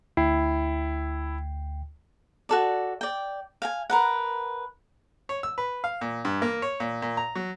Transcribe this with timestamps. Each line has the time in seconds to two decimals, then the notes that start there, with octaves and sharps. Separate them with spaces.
0.17 D2 E4 G5 C7
2.49 F#4 A4 D5
3.01 D5 G5
3.62 F5 G5 G#5
3.90 A#4 B4 F#5
5.29 C#5
5.43 E6
5.58 B4
5.84 F5
6.01 A#2
6.25 G2
6.42 A#3
6.62 C#5
6.80 A#2
7.02 A#2
7.17 A#5
7.35 F#3